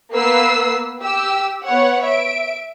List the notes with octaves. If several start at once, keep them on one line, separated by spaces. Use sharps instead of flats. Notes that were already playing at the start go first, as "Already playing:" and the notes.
A#3 B3 B4 E6 C7
G4 E6
B3 C#5 F#5
E5 D7